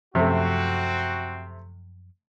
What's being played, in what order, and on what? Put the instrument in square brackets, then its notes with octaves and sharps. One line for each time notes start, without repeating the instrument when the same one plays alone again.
[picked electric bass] F#2 F3 C#4 [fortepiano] C3 A3 [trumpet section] C4 F#4